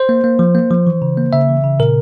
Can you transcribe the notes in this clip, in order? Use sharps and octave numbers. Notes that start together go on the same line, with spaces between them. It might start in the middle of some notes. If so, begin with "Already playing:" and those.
Already playing: C5
A#3
A#3
F3
A#3
F3
E3
C#3
A#3
C#3 E5
E3
C#3
A#2 A#4